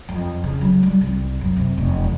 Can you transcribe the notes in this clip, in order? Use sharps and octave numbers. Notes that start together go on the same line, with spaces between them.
F2
C#3
F#3
G3
C2
F#2
C3
F1
E3